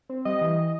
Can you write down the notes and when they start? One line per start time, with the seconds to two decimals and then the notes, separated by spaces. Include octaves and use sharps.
0.09 C4
0.25 G3 D#5
0.41 E3